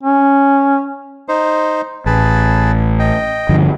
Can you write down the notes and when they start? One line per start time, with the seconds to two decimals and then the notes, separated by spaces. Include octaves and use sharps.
0.03 C#4
1.28 D#4 C5
2.06 A1 G#4 B4 A5
2.99 D#5 G5
3.49 G2 D3 F3